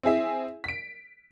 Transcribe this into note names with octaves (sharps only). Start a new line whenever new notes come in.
C4 E4 G#4 E5
B6 D7